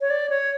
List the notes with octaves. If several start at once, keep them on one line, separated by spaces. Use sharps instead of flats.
C#5
D5
C#5